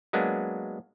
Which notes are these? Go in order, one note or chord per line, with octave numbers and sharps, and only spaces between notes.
F#3 G#3 A#3 B3 D4